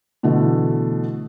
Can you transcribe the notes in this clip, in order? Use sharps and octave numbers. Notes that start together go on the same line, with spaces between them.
B2 D3 E3 A3